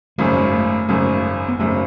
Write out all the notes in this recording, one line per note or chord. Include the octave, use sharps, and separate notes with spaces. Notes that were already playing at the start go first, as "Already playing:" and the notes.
G#1 F#2 C#3 G#3
A3
G#3
A3
G#1 F#2 C#3
B3
G#1 F#2 C#3 A3